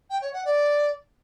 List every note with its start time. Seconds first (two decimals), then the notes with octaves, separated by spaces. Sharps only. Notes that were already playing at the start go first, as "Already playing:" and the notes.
0.10 G5
0.22 C#5
0.33 F#5
0.45 D5